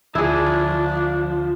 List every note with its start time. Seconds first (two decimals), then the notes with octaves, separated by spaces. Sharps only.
0.15 D2 D3 F3 D4 E4 G#4